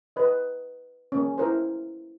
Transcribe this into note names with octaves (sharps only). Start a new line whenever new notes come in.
B4 D#5
A#3 C#4
E4 A#4 C5